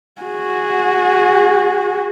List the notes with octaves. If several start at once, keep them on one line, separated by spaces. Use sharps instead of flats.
F#4 G#4